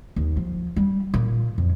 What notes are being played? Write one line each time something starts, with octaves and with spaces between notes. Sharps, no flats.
D#2
F3
G3
A#2
F2